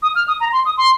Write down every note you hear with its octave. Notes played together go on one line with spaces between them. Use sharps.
D#6
F6
D#6
A#5
C6
D#6
C6